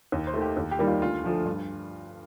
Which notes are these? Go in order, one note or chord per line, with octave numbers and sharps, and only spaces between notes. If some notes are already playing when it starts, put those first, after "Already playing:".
D#2
C5
D#3 A3
G4
D#2
G4
D#3 G3 A#3
F4
D2 F4
D3 F3 A3
G2